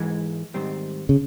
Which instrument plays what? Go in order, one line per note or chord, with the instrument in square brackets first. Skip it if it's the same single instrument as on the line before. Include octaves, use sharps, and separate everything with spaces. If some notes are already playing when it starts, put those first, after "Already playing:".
Already playing: [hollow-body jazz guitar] G#2 E3 G#3
G#2 D#3 G3 C4
[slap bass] C#3